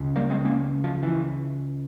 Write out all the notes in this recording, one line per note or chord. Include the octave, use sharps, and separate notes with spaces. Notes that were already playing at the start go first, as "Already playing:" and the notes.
Already playing: C#2
G3 A#3
G#3 C4
A#3 C#4
F3
E3